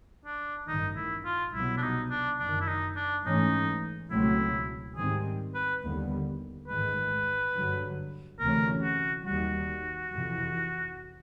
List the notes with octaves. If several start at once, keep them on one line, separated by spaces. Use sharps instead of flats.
D4
A1 G2 D#3 D#4
E4
F4
C2 B2 F#3 B3 E4
D4
D#4
D4
F#1 F#2 D#3 D4
E4
D#4
D4
G#2 E3 A3 C#4 D#4
C#2 B2 F#3 A3 C4 E4
G#2 D#3 G3 C4 G#4
B4
D#2 D3 G3 B3
A1 G#2 D#3 G#3 B4
G2 D3 F#3
D2 C3 E3 A3 C#4 A#4
F#4
D#2 D#3 G3 F#4
F2 C3 E3